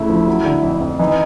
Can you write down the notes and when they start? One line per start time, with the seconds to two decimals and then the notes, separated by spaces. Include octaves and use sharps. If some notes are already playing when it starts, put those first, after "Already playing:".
Already playing: D2 C#3 A3 E4
0.09 F3
0.27 F#3
0.45 D3
0.63 F2
0.81 F2
0.99 E3 D#4